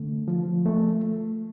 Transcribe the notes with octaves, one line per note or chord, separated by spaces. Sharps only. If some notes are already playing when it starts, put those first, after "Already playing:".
Already playing: D3 A3
F3
A3